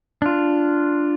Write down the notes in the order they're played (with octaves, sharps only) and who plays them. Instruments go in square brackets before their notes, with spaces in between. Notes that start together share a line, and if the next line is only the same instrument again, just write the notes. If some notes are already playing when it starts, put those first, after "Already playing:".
[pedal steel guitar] D4 F4